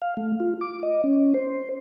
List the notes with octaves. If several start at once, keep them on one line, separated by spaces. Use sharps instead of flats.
F5
A3
F4
D6
D#5
C#4
C5